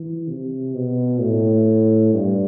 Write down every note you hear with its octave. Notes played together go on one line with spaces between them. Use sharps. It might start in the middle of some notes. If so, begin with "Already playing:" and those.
Already playing: E3
C3
B2
A2
G2